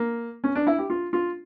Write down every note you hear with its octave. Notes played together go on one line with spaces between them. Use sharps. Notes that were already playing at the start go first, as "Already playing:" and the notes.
Already playing: A#3
C#4
D4
E4
G4
F4
F4